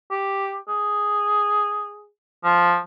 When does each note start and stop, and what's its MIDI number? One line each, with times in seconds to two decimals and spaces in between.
0.11 0.57 67
0.68 2.08 68
2.44 2.78 53